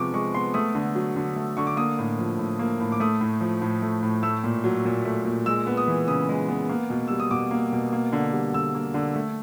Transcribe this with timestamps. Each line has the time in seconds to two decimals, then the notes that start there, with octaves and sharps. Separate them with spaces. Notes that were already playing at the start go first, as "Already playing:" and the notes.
Already playing: C3 F3 G#3 B3 C#6 D6
0.14 G#3 C#6
0.34 B3 C6
0.54 A3 D#6
0.75 D3
0.95 F#3
1.16 D3
1.36 A3
1.57 D3 C#6
1.67 D6
1.77 A#3 D#6
1.98 A2
2.19 F3
2.39 A2
2.59 A#3
2.80 A2
2.92 D6
3.00 A3 D#6
3.21 A2
3.41 F3
3.62 A2
3.82 A3
4.03 A2
4.23 A3 E6
4.44 A#2
4.64 F#3
4.85 A#2
5.05 A3
5.25 A#2
5.46 G#3 E6
5.67 B3
5.77 D#6
5.88 E3
6.08 C#3 D#6
6.29 G#3
6.48 B3
6.69 A#3
6.90 B2
7.08 G3 E6
7.20 D#6
7.31 B2 D6
7.51 A#3
7.72 B2
7.93 A#3
8.12 D3
8.33 G3
8.54 D3 E6
8.74 A#3
8.94 D3
9.15 A3